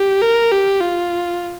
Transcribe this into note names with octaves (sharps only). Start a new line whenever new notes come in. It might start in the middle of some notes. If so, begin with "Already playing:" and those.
Already playing: G4
A#4
G4
F4